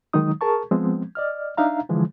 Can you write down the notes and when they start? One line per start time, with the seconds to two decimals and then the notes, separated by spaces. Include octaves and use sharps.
0.13 D#3 F#3 G#3 D#4 D#6
0.41 G#4 A#4 A5 C#6
0.71 F3 G#3 B3 C4
1.15 D5 D#5 F6
1.57 D4 D#4 E5 F5 A#5
1.89 D3 E3 F3 G#3